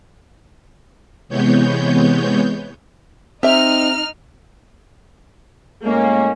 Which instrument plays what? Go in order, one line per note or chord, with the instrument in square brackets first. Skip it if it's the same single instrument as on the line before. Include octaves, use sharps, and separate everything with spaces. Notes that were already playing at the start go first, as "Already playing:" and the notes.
[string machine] C3 E3 G#3 B3 C#5 G6
[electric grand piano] C4 [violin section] D#4 F6 [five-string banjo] G4 E5
[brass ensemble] A2 G#3 C#4 [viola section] A#3